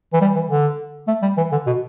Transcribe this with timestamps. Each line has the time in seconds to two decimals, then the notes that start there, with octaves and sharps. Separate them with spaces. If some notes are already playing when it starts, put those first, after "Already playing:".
0.13 E3
0.21 G3
0.36 E3
0.49 D3
1.08 A3
1.22 G3
1.37 E3
1.52 D3
1.67 B2